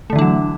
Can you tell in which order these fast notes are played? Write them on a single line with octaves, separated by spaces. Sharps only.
A3 D3 E3 D4 F#3